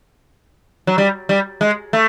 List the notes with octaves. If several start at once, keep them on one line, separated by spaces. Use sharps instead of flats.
F#3
G3
G3
G#3
A3